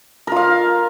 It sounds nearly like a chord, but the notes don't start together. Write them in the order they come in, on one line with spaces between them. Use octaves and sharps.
A#4 F4 F5